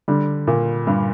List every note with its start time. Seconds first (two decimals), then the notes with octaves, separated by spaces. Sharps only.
0.08 D3 G3
0.47 A#2
0.87 G2